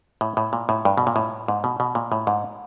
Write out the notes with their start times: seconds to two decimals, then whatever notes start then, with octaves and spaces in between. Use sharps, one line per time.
0.21 A2
0.37 A2
0.53 A#2
0.69 A2
0.85 G2
0.98 B2
1.07 A#2
1.16 A2
1.48 G#2
1.64 B2
1.80 B2
1.95 A#2
2.12 A2
2.27 G#2